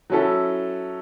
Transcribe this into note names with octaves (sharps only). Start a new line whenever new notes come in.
F#3 C#4 E4 A4